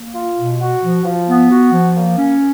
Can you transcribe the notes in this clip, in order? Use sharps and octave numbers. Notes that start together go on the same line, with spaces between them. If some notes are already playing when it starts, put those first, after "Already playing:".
Already playing: A#3
F4
B2
F#4
F3
F3
B3
F#4
F3
A#3
C#4